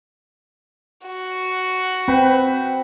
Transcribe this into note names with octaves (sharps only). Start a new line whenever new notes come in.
F#4
C4 B4 G5 B5